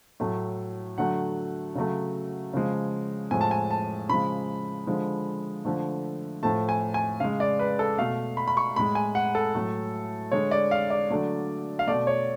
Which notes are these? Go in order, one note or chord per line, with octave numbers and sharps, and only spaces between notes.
A2 F#3 A3
D3 F#3 A3 F#5
C#3 F#3 A3
C#3 F3 G#3
A2 F3 G#3 G#5
A5
G#5
A5
C#3 F3 G#3 B5
D3 F3 G#3
D3 F3 A3
A2 F3 A3 A5
G#5
G#5
C#3 G#3 F5
D5
B4
A4
B2 A3 F5
B5
B5
C#6
A2 G#3 B5
G#5
F#5
A4
A2 F#3 A3
D3 G#3 C#5
D5
F5
D5
D3 F#3 A3
F5
B2 A3 D5
C#5